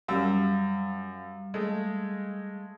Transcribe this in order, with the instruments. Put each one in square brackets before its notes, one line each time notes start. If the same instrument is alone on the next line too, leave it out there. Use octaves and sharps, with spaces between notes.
[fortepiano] F#2 E6 [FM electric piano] G3 F5
[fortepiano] G#3 A3